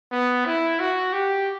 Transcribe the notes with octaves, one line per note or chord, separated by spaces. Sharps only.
B3
E4
F#4
G4